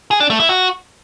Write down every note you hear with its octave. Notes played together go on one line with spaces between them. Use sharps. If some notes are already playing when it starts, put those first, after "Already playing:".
G#4
D4
A3
E4
F#4